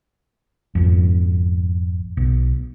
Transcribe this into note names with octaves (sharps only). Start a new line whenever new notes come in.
G#1 F2
B1